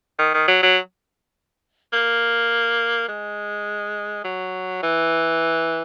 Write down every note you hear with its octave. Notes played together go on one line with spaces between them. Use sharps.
D#3
D#3
F#3
F#3
A#3
G#3
F#3
E3